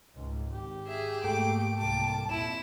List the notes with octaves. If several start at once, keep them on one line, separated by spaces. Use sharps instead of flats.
C#2 G#2
G#1 G4
G#4 E5
G#2 A3 A#3 A4 G5 D6
C2 A#3 A5 D6
A#1 F2 E4 E7